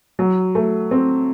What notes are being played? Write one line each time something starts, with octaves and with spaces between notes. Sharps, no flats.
F#3
A3
C4